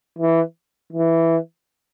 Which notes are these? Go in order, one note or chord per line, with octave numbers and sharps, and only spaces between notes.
E3
E3